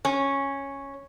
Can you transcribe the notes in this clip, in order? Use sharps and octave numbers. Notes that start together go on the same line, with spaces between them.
C#4